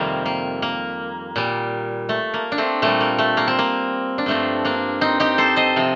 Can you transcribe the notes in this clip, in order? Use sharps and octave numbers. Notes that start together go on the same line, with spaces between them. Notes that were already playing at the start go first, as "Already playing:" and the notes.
Already playing: F2 C3 D#3 G3 A#3
A#3
A#3
A#2 G3
A3
A#3
D4
A3 C4
A#2 G3 A3
A#3
A3
A#3
C4
A#3
D4
G2 F3 A3 C4
A#3 D4
C4 D#4
D#4 G4
A4 C5
C5 D#5
C3 F3